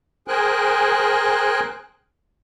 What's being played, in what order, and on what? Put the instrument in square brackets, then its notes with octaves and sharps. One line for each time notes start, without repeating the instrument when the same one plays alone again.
[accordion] G#4 A#4 C5 G5 G#5 F#6